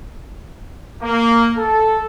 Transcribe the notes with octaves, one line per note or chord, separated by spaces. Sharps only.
A#3
A4